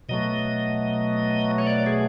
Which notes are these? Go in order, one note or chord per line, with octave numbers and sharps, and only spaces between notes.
B2 F#3 A3 D#5
C#5
D5
G#4